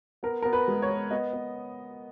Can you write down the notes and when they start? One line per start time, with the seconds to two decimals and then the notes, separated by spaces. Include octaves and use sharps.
0.23 B3 A#4
0.42 B3 A#4
0.53 B4
0.68 G#3
0.82 C#5
0.89 B3
1.11 B3 D#5
1.33 B3